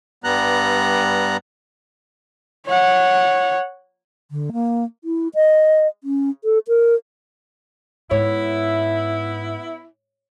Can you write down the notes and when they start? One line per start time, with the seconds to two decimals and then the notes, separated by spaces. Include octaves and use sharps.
0.24 G2 G3 B3 A#5 F#6
2.67 C#5 F#5
4.31 D3
4.53 A#3
5.04 E4
5.35 D#5
6.04 C#4
6.44 A4
6.68 A#4
8.11 G#2 B3 E4 C#5